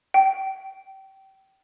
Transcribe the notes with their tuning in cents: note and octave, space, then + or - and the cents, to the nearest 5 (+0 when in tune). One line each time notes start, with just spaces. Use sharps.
G5 -25